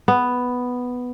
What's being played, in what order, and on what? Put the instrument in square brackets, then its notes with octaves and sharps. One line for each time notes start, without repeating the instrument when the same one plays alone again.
[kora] B3